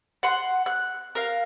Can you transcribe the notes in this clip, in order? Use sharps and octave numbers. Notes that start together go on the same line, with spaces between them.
F#5 C6
F#6
A#4 F5